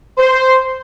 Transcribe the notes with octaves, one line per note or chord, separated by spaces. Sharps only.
C5